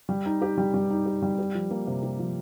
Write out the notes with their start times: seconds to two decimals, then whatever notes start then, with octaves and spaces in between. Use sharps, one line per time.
0.09 G3
0.26 D#4
0.42 G4
0.58 G3
0.74 G3
0.90 D#4
1.06 G4
1.22 G3
1.39 G4
1.55 F3
1.71 A#3
1.87 C3
2.03 G4
2.19 F3